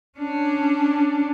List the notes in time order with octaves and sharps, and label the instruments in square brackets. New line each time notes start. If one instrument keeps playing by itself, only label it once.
[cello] C#4 D4